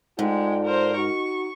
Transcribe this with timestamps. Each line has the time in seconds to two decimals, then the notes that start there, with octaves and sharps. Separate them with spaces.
0.19 G#2 G#3 F4 A4 D5 G5
0.65 A#4 C5
0.97 D#4 F#4 C#6